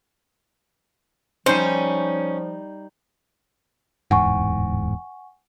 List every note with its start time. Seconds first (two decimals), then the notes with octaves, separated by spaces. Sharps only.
1.46 F3 G3 C#4 D#4 C5
4.11 D1 E2 G#2 F#5 G#5 C#6